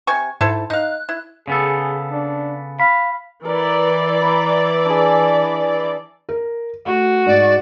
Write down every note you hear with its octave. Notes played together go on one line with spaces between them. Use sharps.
C3 G#5 C#6
G#2 E4 A4 C5
D#4 F5 F#6
E4
C#3 B3 G#4 A4
D4
F5 B5
E3 A#4 D5
A#5 B5
D4 G#4
A#4
A3 F#4
G#2 D5